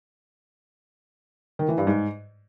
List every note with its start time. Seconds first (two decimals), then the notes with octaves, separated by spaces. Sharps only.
1.59 D#3
1.68 E3
1.78 G2
1.87 G#2